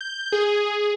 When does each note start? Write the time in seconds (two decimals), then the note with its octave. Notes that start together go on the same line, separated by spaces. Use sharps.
0.01 G6
0.32 G#4